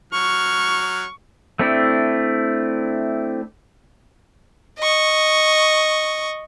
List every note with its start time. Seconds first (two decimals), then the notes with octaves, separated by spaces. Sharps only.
0.13 F#3 C#6 F6
1.59 A3 C4 D4 E4
4.79 D#5 C#6